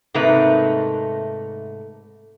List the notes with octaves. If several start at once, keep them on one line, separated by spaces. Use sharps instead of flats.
G#2 C3 A3 A#3 D#4 B4